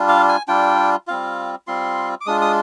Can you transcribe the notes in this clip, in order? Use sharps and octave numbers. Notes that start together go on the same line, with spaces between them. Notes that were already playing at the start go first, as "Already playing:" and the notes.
Already playing: G3 D4 F4
F5
G#5
G3 D4 F4 G5
G3 C4 F4 F5
G3 C4 F4 C6
D6
G#3 D4 F4 D#6
D#6